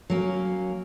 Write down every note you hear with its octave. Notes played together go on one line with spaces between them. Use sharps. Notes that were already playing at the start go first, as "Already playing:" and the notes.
F#3 A#3 C#4